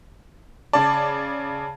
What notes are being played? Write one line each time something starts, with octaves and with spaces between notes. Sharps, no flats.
C#3 D5 A5